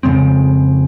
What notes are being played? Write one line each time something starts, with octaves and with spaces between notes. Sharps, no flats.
F2 C#3 G#3 C4